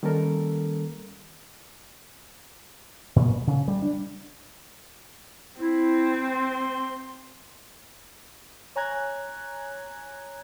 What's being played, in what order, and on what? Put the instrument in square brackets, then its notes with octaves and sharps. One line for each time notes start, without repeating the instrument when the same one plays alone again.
[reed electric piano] D#3 G3 A#3 C#4 A4 A#4
[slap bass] A#2
C#3
G3
D4
[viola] C4 [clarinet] E4
[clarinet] C6
[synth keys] C#5 G#5 A#5 F#6 G#6